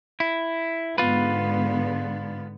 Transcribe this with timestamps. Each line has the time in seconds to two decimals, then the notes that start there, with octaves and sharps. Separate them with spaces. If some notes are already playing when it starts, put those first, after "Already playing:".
0.20 E4
0.98 G#2 D3 B3 F4 B4